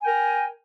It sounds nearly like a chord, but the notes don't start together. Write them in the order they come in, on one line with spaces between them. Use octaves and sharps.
G#5 G5 A#4